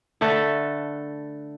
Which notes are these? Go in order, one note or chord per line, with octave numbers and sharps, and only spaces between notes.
D3 A3 A4 B4